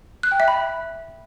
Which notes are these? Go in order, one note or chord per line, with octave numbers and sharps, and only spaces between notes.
F#6
G5
E5
B5